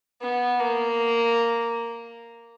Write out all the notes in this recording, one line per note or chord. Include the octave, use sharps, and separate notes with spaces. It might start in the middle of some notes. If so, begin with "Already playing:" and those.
B3
A#3